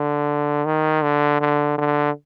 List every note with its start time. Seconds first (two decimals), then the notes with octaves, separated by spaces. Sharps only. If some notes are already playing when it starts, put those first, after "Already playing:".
Already playing: D3
0.66 D#3
1.02 D3
1.41 D3
1.78 D3